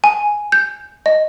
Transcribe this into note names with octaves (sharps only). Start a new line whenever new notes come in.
G#5
G6
D#5